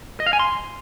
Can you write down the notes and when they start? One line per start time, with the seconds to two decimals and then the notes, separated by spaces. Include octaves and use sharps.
0.20 D#5
0.26 F5
0.33 G#5
0.39 C6